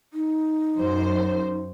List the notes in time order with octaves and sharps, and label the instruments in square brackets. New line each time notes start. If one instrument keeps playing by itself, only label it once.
[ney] D#4
[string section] F#2 C5